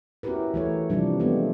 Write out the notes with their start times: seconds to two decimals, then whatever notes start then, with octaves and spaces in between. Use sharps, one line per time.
0.23 C#4 E4 F#4 G4 A#4 B4
0.54 E3 A3 C#5
0.90 C3 E3 F3 G3 D4
1.20 G#3 A3 B3 D4 G4